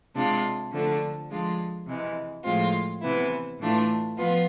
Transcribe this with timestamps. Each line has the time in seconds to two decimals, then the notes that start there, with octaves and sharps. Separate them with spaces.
0.15 C3 G#3 D4 F4
0.72 D3 F3 A3 D4
1.30 F3 G#3 D4 F4
1.86 C3 E3 G#3
2.44 A2 F3 G#3 C4 F4
3.01 C3 E3 B3 E4
3.59 A2 E3 A3 D4 F4
4.17 F3 B3 F4